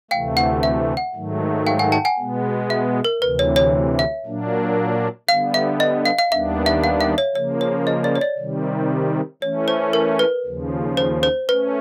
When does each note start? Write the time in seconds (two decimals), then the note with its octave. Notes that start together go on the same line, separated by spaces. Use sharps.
0.11 D2 C3 E3 A3 F5 G5
0.37 F#5
0.63 E5
0.97 F#5
1.15 G#2 D#3 F#3 A3
1.67 F5 G5
1.79 F#5 G#5
1.92 G5 A5
2.05 F#5 G#5
2.18 B2 G#3 B3
2.70 E5
3.05 A#4
3.21 D2 C3 E3 B4
3.39 C#5
3.56 C#5
3.99 E5
4.26 A#2 F#3 A#3 D4
5.29 D3 G3 B3 F5
5.54 E5
5.80 D#5
6.06 F5
6.19 F5
6.31 D#2 D#3 G3 B3 D4 E5
6.66 E5
6.84 F5
7.01 E5
7.18 C#5
7.35 C#3 F3 A#3 C#5
7.61 C#5
7.87 D#5
8.04 D5
8.15 C#5
8.21 D5
8.38 C3 D#3 G3
9.42 E3 A3 C#4 C#5
9.68 C5
9.93 A#4
10.19 B4
10.46 D#2 C#3 F3
10.97 C5
11.23 C5
11.49 A3 C#4 B4